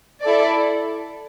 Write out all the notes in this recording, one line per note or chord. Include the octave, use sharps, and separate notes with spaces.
E4 A4 D5